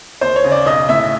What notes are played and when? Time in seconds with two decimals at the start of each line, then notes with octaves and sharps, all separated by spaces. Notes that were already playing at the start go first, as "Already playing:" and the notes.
0.21 D#2 C5
0.36 C#5
0.44 C#3
0.51 D5
0.66 B1 D#5
0.89 A2 E5